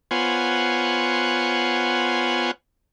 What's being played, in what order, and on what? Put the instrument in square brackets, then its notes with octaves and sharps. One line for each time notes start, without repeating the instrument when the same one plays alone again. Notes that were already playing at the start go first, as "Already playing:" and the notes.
[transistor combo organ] B3 F4 C5 C#5 F#5 G#5